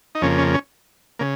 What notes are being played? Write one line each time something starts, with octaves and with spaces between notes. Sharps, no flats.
D#4
F2 C#3 A#3 C#4
C#4
C#4
C#3 A#3